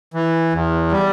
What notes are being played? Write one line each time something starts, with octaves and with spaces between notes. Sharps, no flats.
E3
E2
G3